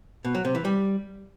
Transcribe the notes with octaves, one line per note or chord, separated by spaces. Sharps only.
B2
F#3
C3
E3
G3